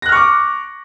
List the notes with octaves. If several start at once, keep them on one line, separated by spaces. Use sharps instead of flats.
C#6 D6 F6 F#6 A#6